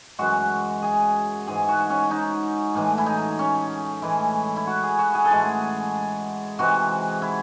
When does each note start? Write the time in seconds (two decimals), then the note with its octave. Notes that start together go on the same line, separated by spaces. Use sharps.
0.19 F#2 E3 G#3 F#4
0.82 G#4
1.47 G#2 E3 G#3 G#4
1.69 F#4
1.90 C#4
2.11 D#4
2.75 A2 E3 G#3
2.98 E4
3.06 D#4
3.39 C#4
4.02 A2 E3 G#3 E4
4.56 E4
4.67 F#4
4.83 G#4
4.99 F#4
5.15 G#4
5.25 A4
5.30 A2 E3 G#3 G#4
6.59 C3 E3 G#3 F#4
7.22 E4